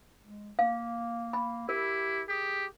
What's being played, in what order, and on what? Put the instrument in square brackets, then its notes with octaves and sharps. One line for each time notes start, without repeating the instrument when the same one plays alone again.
[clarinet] G#3
[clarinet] A#3 [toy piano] F5
[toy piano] B5
[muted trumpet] E4 [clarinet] G4 [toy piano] A#4
[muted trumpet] G4 [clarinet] G#4